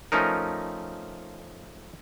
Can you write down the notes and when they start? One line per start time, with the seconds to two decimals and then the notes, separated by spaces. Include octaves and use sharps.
0.12 F3 A3 C#4 D#4 A#4